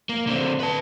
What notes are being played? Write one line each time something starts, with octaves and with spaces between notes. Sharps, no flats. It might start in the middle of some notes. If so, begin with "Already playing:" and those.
A#3
D3 C4
B4 A5